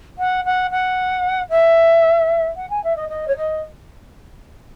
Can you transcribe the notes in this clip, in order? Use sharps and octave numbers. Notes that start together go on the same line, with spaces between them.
F#5
F#5
F#5
E5
F#5
G#5
E5
D#5
D#5
C#5
D#5